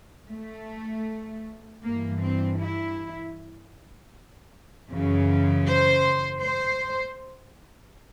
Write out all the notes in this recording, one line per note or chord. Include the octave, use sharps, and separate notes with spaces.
A3
G2 E3 A#3
C4
E4
F#2 C#3 E3
C5
C5